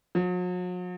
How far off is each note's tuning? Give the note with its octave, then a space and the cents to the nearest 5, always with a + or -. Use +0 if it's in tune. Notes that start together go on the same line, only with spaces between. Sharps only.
F#3 -45